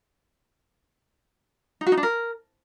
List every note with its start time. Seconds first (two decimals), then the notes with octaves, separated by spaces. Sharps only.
1.81 D#4
1.86 F#4
1.92 D#4
1.97 D4
2.03 A#4